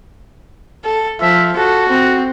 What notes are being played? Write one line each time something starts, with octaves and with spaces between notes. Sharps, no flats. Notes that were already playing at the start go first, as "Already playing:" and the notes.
A4
F3 E5
F#4 A4
C4